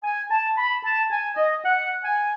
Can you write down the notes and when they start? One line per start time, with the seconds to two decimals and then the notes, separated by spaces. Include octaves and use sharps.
0.04 G#5
0.30 A5
0.57 B5
0.84 A5
1.11 G#5
1.37 D#5
1.64 F#5
2.04 G#5